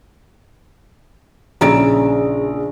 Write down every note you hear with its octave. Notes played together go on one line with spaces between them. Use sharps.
A#1 C#3 C#4 E4 A#5 D7